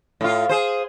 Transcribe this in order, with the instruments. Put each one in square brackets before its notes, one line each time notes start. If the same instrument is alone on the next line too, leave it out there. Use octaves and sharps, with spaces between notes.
[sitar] A2 F4
G#4 C5